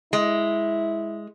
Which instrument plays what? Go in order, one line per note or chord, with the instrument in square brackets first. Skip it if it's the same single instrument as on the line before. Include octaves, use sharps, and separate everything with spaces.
[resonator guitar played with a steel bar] G#3 [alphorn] E4